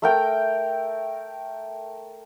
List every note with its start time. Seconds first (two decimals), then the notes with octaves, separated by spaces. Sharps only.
0.02 A3 A#4 G5